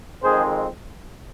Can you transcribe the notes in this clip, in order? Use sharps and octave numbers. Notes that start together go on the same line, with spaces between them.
F2 D#3 G#3 C4 G#4 C5